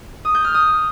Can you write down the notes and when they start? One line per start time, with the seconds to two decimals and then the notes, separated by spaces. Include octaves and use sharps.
0.25 D#6
0.35 G6
0.45 F6
0.54 D#6